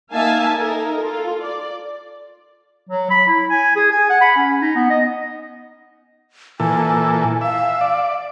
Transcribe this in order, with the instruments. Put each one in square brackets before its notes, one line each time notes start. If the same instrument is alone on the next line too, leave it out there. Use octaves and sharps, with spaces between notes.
[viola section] A#3 D#4 E5 F5 G#5 A5
D#4 A4 A#4
F4 A4
D5
[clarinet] F#3
B5
E4
G#5
G#4
G#5
F#5
B5
C#4
D#4
B3
D#5
[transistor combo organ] A#2 E3 A4 [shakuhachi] G#5
[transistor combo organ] E5 [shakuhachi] F5
[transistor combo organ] D5